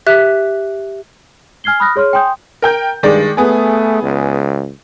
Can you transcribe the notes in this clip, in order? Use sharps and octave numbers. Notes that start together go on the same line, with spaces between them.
G4 E5 F#6 B6
G#5 F6 G#6 C7 G7
B5 D#6 F6 F#6 A#6
G#4 C#5 C6 F6
G5 G#5 C6 D#6 G6
A#4 G5 G6
G2 D#3 G#3 D5
A3 B3 G#4
C#2